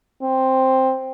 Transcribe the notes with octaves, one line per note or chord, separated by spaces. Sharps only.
C4